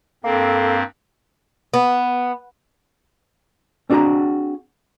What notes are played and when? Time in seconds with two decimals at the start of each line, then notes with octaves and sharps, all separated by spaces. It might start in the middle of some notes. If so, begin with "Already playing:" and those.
0.24 G2 A#3 C4 A4
1.74 B3
3.90 C4 D4 F#4 G#4 F#5 A#5